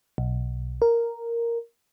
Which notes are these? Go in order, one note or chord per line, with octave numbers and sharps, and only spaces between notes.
B1
A#4